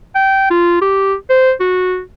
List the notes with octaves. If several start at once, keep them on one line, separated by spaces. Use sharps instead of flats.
G5
F4
G4
C5
F#4